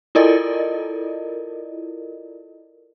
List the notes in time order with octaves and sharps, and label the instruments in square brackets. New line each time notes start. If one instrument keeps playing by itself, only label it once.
[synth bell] E4 F4 A4 A#4 D5 D#5